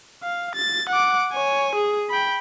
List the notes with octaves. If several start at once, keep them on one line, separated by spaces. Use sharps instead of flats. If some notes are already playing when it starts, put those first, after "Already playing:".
F5
A6
F#5 D6
C#5 G#5
G#4
G5 B5